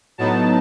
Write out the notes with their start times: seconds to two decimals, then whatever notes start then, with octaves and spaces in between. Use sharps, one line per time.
0.18 A2 F#3 B3 D#4 A5